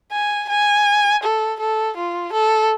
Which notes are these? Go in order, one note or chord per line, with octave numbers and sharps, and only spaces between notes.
G#5
G#5
A4
A4
F4
A4